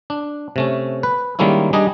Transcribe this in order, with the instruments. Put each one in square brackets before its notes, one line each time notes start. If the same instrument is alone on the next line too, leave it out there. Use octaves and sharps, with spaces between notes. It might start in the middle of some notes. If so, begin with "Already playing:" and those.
[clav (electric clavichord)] D4
C3 A3 C#4
B4
D#3 G3 G#3 A#3 C#4 E4
G3 D4 D#4 G#4 D#5